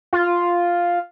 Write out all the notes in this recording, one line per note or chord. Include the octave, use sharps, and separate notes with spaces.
F4